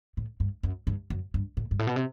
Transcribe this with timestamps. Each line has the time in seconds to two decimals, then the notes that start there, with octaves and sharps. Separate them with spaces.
0.17 A2
0.40 G2
0.63 F#2
0.87 G2
1.10 F#2
1.34 G2
1.57 A2
1.71 G2
1.79 A2
1.87 B2
1.96 C3